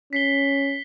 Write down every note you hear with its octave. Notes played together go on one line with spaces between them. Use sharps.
C#4 B6 C7 G7